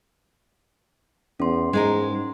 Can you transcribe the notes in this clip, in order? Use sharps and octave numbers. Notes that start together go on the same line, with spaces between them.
E2 C#4 C6
G#2 G#3 D#4 A#4